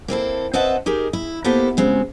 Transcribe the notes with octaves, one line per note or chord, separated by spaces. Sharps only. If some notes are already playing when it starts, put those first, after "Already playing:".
A#3 C4 E4 A4
C4 B4 D#5 E5 F#5 A5
D#4 G4 G#4 A#4
E4
A#3 B3 E4 G4 A4 C5
C#3 G#3 C4 F#4